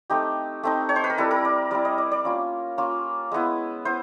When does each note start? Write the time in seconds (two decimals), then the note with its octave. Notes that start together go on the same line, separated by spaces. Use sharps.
0.10 A3 C4 D#4 G4
0.63 A3 C4 D#4
0.89 C#5
0.96 C5
1.04 B4
1.10 A#4
1.18 G3 C4 E4 A4
1.31 A#4
1.45 D5
1.71 G3 C4 E4 D5
1.85 D#5
1.98 D5
2.12 D5
2.25 A#3 C#4 F4
2.78 A#3 C#4 F4
3.32 G#3 B3 E4
3.85 B3 E4 C5